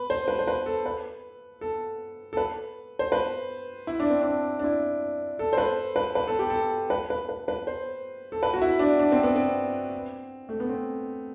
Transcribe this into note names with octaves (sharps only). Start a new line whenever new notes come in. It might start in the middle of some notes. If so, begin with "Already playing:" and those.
Already playing: B4
C5
B4
C5
B4
A4
B4
A4
A4
B4
C5
B4
E4
D4
C4
D4
D4
E4
A4
C5
B4
B4
B4
A4
G4
A4
B4
B4
B4
B4
C5
A4
B4
F#4
E4
D4
D4
C4
B3
C4
A3
B3
C4